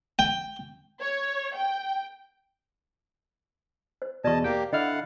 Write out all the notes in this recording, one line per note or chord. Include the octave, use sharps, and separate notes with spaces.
G5
C#5
G5
C5
E2 B2 D5 D#5 A5 C#6
A#3 G4 G5
D3 E4 D#5 F5 F#5 F6